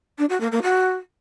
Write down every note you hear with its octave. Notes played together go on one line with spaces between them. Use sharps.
D4
F#4
A#3
A#3
F#4